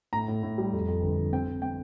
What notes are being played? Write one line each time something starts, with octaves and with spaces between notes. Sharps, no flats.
A2 A#5
A2
A2
G3
F2
F2
G1
G1
C4 G5
C4
C4 G5